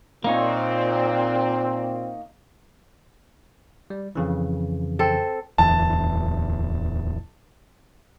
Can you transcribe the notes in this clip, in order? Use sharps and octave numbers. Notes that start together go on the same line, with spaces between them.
A#2 A#3 C4 D#4 C#5
G3
F2 C#3 E3
C4 A4
D1 E2 A5